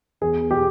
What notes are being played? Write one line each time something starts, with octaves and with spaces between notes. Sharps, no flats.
E2 G#4
B2 G4